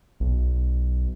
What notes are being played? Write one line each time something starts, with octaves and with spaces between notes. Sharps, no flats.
B1